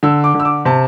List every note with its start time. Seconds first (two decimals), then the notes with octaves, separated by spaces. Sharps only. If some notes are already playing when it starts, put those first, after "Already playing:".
0.03 D3 E6
0.24 D6
0.34 D3
0.40 E6
0.45 D6
0.65 C3 A5